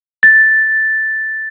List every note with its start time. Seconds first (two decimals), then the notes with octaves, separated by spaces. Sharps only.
0.23 A6